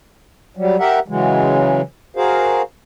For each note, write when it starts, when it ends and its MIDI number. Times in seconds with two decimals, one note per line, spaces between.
0.57 0.77 54
0.57 0.77 55
0.79 0.99 67
0.79 0.99 70
0.79 0.99 76
0.79 0.99 78
1.08 1.81 49
1.08 1.81 52
1.08 1.81 54
1.08 1.81 56
2.16 2.62 66
2.16 2.62 68
2.16 2.62 70
2.16 2.62 72
2.16 2.62 77